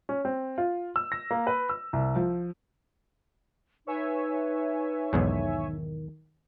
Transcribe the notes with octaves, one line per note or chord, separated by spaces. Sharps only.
C#4
C4
F4
E6
A#6
A#3
B4
E6
C2
F3
D#4 B4 C#5 E5 G#5
B1 E2 G#2 D#3